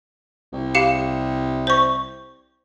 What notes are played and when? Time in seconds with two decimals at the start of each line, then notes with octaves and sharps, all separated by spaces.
0.53 C2
0.75 G4 F5 C#7
1.67 C5 C#6